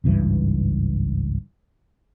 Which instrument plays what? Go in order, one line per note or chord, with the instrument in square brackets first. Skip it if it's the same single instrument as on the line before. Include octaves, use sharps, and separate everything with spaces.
[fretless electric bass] G#1 C#2 G2 E3